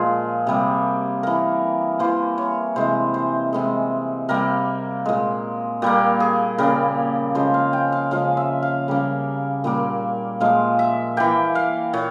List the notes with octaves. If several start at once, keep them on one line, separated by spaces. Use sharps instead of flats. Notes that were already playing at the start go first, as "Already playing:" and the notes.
Already playing: A#2 F3 G#3 G#4
C3 G3 A#3
E3 A#3 A#4
E3 A#3 C5
C#5
C3 E3 G#3 C5
C5
C3 E3 G#3
C3 G3 A#3 A#4
A#2 G#3
A#2 G3 A#3 G4
G#4
C#3 G3 A#3 A#4
C#3 F3 G#3 C5
F5
G5
F5
C#3 F3 G#3 F5
E5
F5
C#3 G3 A#3
A#2 G3 A#3
A#2 F3 G#3 F5
E5
E3 A#3 G5
F5
A#2 C#5